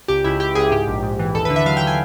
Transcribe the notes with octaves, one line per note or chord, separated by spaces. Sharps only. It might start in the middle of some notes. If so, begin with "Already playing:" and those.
C#2 G4
C#2 E4
C#2 G4
C#2 G#4
G#2 G4
A#1
G#2
E3
D#2 A4
D3 B4
E5
F#3 F5
D3 G5
G#5